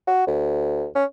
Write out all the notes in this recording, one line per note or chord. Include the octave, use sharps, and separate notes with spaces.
F#4
D2
C#4